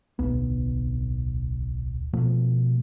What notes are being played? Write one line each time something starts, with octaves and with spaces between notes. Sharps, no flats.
D1 B1 B3
B2 F3 A3